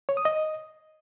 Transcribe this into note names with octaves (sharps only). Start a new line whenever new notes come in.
C#5
D#6
D#5